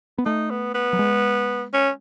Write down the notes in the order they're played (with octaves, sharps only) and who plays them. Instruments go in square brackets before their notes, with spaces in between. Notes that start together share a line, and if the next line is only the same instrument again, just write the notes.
[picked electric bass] B3
[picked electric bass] A3 [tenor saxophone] D#4
[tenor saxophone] B3
B3
[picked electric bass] F#3
G#3
[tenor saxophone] C#4